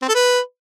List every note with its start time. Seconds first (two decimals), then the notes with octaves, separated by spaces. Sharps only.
0.02 C4
0.08 A4
0.15 B4